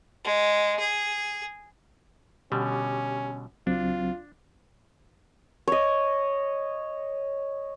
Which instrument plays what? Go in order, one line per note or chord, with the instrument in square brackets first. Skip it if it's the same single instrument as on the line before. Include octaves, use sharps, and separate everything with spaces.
[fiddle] G#3
G#4
[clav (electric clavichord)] B2 D3 G3 [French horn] C#4 [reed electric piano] G4
[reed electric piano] C#2 F#3 C4 [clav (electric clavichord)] D4 [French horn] F4
[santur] C#5 D#5